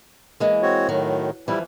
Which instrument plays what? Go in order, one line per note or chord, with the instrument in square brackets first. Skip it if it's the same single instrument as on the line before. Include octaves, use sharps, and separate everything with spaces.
[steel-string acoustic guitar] E3 G#3 A#3
[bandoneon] C4 F#4 C#5
[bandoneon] A2 D#3 [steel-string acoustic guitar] F#3
[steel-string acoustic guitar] E3 F3 [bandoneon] G3 E4